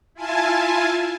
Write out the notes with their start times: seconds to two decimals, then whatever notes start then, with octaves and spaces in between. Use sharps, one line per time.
0.14 E4 F4 G#5 A5